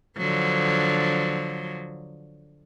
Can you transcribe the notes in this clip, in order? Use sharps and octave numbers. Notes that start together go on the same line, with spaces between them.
D3 F3 F#3